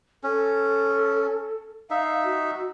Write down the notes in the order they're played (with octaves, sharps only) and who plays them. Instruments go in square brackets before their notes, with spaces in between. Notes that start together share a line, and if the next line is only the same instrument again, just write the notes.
[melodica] C#4 [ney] A4
[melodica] D#4 E5 [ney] F5
[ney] F#4